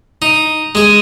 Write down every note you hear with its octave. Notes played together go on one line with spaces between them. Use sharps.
D#4
G#3 G#4